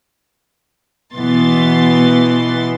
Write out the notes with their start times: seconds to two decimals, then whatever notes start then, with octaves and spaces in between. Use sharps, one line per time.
1.15 B2 E3 B3 C6 A6